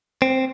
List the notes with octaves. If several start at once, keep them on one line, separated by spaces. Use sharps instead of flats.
C4